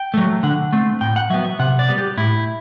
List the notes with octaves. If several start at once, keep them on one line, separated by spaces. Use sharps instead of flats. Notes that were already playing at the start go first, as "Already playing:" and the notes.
Already playing: G5
F#3 A3
D3 F#5
A3 C4
A2 G5
F#5
F#3 B3 E5
E5
C3 F#5
D5
G3 B3
G4
A2 E4